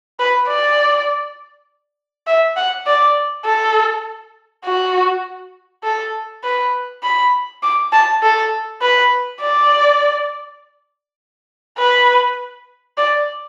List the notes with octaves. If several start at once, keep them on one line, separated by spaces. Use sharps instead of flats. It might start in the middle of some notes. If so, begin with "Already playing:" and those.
B4
D5
E5
F#5
D5
A4
F#4
A4
B4
B5
D6
A5
A4
B4
D5
B4
D5